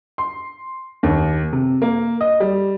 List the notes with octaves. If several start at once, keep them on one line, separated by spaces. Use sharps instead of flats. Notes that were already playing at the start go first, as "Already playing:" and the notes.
C6
D#2
C3
A#3
D#5
G3